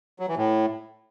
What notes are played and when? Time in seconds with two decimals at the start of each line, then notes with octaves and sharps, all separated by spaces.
0.19 F#3
0.28 E3
0.37 A2